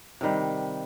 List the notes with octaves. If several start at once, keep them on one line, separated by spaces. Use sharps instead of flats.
C3 D#3 G3